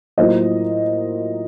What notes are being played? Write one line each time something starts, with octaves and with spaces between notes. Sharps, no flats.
A2 F#3 A#3 F4 C5 D#5